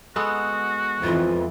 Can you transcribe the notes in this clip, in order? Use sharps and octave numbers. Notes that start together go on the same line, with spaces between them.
G#3 B3 F#4 A4
F2 E3 F4